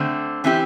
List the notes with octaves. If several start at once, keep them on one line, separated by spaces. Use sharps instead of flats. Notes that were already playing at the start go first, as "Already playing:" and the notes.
Already playing: D3 A3 C4
E3 C4 E4 G4